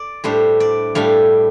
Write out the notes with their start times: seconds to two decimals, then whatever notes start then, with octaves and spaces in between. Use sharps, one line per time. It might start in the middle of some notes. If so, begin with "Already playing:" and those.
Already playing: D5
0.24 A2 G3 D4 C5
0.60 D5
0.95 A2 G3 D4 F5